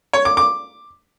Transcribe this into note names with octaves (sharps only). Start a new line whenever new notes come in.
C#5
D6
D6